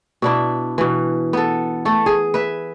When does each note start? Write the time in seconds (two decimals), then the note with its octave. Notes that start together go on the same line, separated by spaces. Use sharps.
0.22 B2 D4 E4
0.78 B2 E3
1.33 B3 A4
1.85 A3 A4
2.06 G#4
2.34 B4 E5